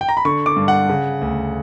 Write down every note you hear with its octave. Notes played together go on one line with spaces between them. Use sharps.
G5
A#5
B5
D3 C#6
D6
G2
F#5
C#3
D2